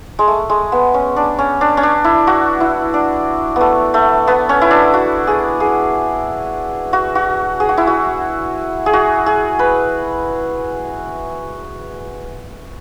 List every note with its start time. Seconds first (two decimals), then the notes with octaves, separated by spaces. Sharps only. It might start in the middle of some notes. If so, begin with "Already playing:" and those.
0.19 G#3
0.28 A3
0.50 G#3
0.72 B3
0.94 C#4
1.16 D4
1.39 C#4
1.61 D4
1.77 C#4
1.83 D4
2.04 E4
2.27 F#4
2.60 E4
2.94 D4
3.56 A3 B3
3.94 A3
4.27 B3
4.49 C#4
4.61 E4
4.71 D4
4.94 F#4
5.27 G#4
5.60 G#4
6.93 F#4
7.15 F#4
7.60 G#4
7.69 F#4
7.77 E4
7.87 F#4
8.86 G#4
8.93 F#4
9.26 G#4
9.59 B4